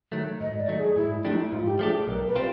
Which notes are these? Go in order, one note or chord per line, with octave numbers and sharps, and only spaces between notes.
D#3 F#3 A3
G#2 D#5
D5
D#3 F#3 A3
G#4
G#2 E4
F3 A3 D4 E4 G4
D#4
E4
G#2 F4
G4
F3 A3 D4 G4 G#4
B1 A#4
B4
G3 C4 F4 C5